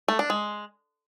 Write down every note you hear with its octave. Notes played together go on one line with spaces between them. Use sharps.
A3
D4
G#3